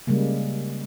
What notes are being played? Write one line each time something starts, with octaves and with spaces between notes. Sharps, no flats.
C#3 G3 G#3 A#3